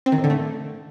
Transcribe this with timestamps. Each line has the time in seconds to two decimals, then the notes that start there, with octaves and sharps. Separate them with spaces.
0.06 C4
0.12 D#3
0.18 A2
0.24 D3
0.30 A3